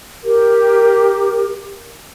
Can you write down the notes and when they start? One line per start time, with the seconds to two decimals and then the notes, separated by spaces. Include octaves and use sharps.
0.24 G4 A#4